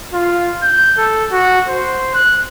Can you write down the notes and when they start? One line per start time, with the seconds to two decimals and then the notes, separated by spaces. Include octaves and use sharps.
0.13 F4
0.63 G6
0.97 A4
1.32 F#4
1.68 C5
2.14 F#6